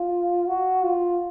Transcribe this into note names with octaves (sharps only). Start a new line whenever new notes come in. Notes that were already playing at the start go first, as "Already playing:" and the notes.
Already playing: F4
F#4
F4